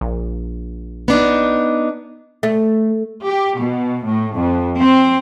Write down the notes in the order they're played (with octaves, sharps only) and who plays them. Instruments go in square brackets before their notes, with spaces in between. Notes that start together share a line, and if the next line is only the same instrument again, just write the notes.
[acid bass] A#1
[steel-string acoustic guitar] B3 D4 D#4
[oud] A3
[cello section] G4
B2
A2
F2
C4